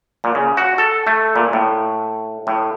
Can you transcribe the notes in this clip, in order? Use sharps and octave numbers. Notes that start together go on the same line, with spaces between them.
A#2
C#3
F#4
A4
A3
A#2
A2
A2